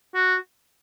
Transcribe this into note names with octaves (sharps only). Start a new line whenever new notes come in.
F#4